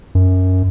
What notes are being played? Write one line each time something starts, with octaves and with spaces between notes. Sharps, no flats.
F#2